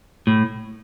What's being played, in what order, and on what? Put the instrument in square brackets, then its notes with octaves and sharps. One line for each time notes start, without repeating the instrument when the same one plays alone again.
[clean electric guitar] A2